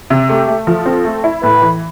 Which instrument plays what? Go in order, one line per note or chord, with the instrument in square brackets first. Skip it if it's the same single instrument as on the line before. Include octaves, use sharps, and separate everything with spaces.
[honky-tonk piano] C3
[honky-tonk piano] A3 [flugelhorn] G4
[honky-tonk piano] A3
[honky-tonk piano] F3 [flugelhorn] A4
[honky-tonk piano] C4
A3
E4
[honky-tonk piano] A2 [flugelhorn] B4
[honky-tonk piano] E3